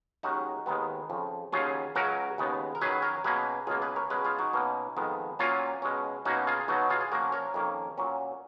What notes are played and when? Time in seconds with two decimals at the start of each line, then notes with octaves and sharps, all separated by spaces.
0.23 D#2 D#3 G#3 C#4 D#4 F#4
0.66 D#2 D#3 G#3 B3
1.10 F2 C#3 F3
1.53 D#2 C#3 F#3 C#4 F4 G#4
1.95 C#2 C#3 F#3 C#4 F#4 A#4
2.38 D#2 C#3 G#3 B3
2.75 A#4
2.81 F#2 D#3 F#3 G#4 B4
3.02 A#4 C#5
3.24 B2 A#3 C#4 G#4 B4
3.67 C#2 B2 A#3 F4 G#4
3.82 G#4 B4
3.96 A#4 C#5
4.10 B2 G#3 C#4 G#4 B4
4.25 F4 G#4
4.39 D#4 F#4
4.53 B2 A#3 C#4
4.97 F2 D#3 G#3 B3
5.39 A#2 F#3 A#3 C#4 F4
5.82 B2 G#3 C#4
6.25 B2 A#3 C#4 D#4 F#4
6.47 F4 G#4
6.68 B2 F#3 B3 D#4 F#4
6.90 F4 G#4
7.01 G#4
7.12 A#2 F3 A#3 C#4 F#4 A#4
7.32 A#4 C#5
7.54 F2 D#3 A#3 C#4
7.98 A#2 F#3 C#4